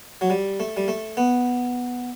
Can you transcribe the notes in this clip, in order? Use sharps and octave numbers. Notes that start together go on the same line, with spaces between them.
F#3
G3
A3
G3
A3
B3